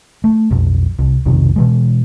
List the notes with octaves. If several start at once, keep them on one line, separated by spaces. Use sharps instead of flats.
A3
B1 F2
C2
B1 F2 C3 D#3
B2 E3 G#3